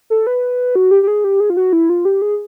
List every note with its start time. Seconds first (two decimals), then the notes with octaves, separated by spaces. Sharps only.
0.10 A4
0.27 B4
0.75 F#4
0.91 G4
1.03 G4
1.07 G#4
1.24 G4
1.40 G#4
1.50 F4
1.57 F#4
1.73 E4
1.90 F4
2.05 G4
2.22 G#4